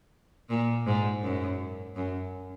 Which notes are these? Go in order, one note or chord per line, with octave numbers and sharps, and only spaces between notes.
A#2
G#2
F#2
F#2